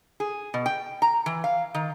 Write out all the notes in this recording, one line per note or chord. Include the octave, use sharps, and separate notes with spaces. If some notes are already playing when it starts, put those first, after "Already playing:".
G#4
B2
G5
A#5
E3
F5
D#3